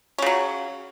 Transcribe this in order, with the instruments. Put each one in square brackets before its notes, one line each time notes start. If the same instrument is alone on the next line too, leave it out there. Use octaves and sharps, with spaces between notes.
[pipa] C#4
C#3
F#3